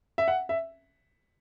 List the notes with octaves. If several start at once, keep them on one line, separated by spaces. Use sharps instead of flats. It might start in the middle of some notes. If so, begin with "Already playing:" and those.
E5
F#5
E5